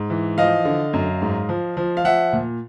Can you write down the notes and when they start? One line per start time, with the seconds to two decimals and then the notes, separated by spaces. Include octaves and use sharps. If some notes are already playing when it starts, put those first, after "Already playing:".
Already playing: G#2
0.10 E3
0.38 F3 D#5 F5
0.65 D3
0.93 F#2
1.21 G#2
1.49 F3
1.77 F3
1.97 F5
2.04 F3 E5 F#5
2.33 A#2